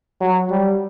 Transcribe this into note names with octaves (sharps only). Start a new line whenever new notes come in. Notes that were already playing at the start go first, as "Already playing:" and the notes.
F#3
G3